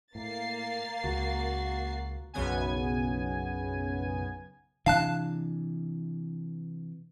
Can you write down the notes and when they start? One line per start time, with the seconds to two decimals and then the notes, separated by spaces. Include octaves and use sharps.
0.15 A2 A#3 A6 C7
1.04 C#2 F#4
2.33 B1 F#2 C#3 B3 G#5
4.86 C3 E3 D4 F5 A5 F#6